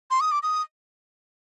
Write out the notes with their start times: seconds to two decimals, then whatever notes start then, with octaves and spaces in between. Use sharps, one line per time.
0.10 C6
0.20 D#6
0.31 D6
0.43 D#6